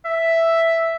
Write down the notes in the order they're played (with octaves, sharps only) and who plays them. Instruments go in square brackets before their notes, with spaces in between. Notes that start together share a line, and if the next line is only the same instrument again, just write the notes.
[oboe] E5